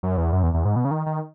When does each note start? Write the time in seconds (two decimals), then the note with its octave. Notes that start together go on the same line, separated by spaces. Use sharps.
0.03 F#2
0.17 E2
0.32 F#2
0.43 E2
0.54 E2
0.65 G#2
0.76 B2
0.85 C#3
0.91 D#3
1.06 D#3